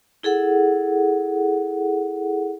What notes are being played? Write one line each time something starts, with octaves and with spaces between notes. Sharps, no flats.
E4 G#4 A4 F#5